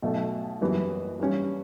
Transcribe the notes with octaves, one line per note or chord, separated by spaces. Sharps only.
B1 B2 A3
F#1 F#2 E3 G3 B3
G2 E3 G3 C#4